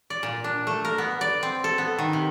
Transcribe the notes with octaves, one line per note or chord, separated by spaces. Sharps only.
D5
A#2
D4
A3
A#4
B3
D5
C4
A4
B3
D#3
C3